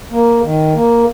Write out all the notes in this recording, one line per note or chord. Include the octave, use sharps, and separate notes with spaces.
A#3
D#3
A#3